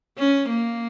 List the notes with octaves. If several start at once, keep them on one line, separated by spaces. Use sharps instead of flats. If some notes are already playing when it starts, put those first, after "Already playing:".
C#4
A#3